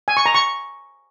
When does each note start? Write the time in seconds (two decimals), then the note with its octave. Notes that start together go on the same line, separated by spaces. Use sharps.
0.08 G#5
0.17 C#6
0.26 A#5
0.35 C#6